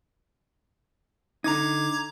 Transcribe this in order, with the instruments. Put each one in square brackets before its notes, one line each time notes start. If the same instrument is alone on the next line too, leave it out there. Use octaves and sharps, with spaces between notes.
[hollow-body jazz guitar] D3 D#4 [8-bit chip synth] A#5 D6 G#6